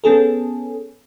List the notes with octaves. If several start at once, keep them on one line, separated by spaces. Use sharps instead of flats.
B3 C#4 G#4 A4